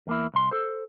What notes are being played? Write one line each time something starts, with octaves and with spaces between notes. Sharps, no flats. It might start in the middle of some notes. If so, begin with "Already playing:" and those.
E2 A#3 E4
C2 C6
A4 C5